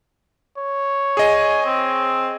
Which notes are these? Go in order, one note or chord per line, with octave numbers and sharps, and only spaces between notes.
C#5
G#4 D#5 G#5
C4